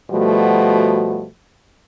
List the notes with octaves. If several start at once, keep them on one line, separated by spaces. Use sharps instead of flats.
B2 F3 G3 A3 F#4